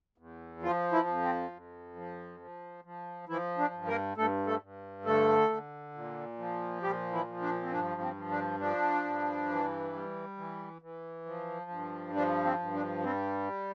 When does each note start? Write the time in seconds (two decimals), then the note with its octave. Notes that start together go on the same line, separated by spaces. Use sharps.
0.18 E2
0.62 F3 F4
0.92 E3 E4
1.07 F2
1.22 C4
1.52 F2
1.96 F3
2.40 F3
2.85 F3
3.28 E3 F3 E4
3.58 D4
3.73 G2
3.87 A#3 A#4
4.17 G2 A3 A4
4.47 A3 A4
4.61 G2
5.05 D3 A3 A4
5.50 D3
5.94 A#2
6.38 F3
6.82 A#2 G3 G4
7.12 E3 E4
7.27 F3
7.42 D4
7.62 C4
7.71 G2 D4
8.01 C4
8.16 F3
8.31 D4
8.60 F3 D4
9.04 G2
9.49 E3
9.93 G3
10.37 E3
10.82 E3
11.26 F3
11.70 G2
12.14 F3 D4
12.44 C4
12.59 G2
12.74 D4
13.03 G3 C4